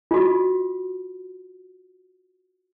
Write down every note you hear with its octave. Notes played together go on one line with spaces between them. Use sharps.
F4 F#4